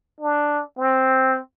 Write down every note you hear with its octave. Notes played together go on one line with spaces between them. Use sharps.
D4
C4